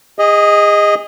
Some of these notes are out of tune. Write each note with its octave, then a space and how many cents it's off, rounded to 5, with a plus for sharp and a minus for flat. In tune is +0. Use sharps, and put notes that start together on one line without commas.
G#4 -30 D#5 +0